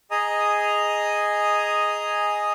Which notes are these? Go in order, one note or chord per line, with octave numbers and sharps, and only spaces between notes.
G#4 D#5 G#5 A#5 D#6